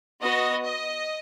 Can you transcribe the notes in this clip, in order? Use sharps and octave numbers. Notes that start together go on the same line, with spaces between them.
B3 F#4 D#5
D#5